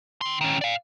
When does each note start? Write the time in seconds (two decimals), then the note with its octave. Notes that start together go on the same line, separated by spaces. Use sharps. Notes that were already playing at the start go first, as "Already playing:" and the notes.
0.21 D#3 C6
0.41 D#3 C#4
0.61 D5 F5